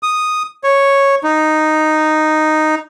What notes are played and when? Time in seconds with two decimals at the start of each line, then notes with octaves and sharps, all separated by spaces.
0.03 D#6
0.64 C#5
1.24 D#4